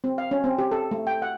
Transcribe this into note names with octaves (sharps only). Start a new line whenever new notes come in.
C4
F5
C#4
C4
G4
A4
A3
G5
F#5